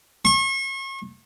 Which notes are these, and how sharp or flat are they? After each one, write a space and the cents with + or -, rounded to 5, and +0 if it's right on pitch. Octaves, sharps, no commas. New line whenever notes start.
C#6 -40